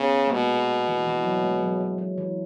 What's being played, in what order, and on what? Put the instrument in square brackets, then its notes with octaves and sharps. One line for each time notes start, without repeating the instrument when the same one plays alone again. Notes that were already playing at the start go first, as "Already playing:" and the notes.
Already playing: [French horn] C#3 [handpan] B3
[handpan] A#3
[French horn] B2 [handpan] G#3
[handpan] E3
E3
F#3
G#3
F#3
F#3
F#3
E3